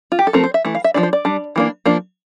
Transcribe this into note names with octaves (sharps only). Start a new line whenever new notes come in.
F4
G4
A4
F3 A3 C4 A#4
C5
E5
E3 A3
F5
E5
F3 A3 D4 D5
C5
D5
G3 D4
E3 A#3 D4
F3 A#3 D4